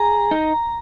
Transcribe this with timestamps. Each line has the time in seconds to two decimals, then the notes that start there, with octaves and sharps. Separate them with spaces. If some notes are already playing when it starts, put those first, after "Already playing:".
Already playing: G#4 A#5
0.31 D#4